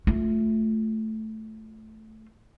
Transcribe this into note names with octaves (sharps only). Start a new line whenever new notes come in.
A3 F4